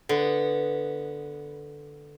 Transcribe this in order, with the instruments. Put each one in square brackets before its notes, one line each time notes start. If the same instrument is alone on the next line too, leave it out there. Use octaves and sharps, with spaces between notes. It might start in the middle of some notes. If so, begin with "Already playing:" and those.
[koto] D3 [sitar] B3